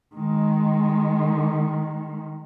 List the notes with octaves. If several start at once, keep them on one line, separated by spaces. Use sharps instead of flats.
D#3 G#3